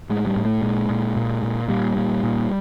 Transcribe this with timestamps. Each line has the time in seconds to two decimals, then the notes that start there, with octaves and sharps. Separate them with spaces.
0.10 A2 G#3
0.27 G3
0.36 A2
0.45 A3
0.62 A#2 G#3
0.90 A#2
1.16 A#2
1.43 A#2
1.69 A#2 G3
1.96 A#2
2.23 A#2